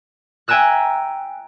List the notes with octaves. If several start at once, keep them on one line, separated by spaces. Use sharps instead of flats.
E5 G5 G#5 A#5 E6 F#6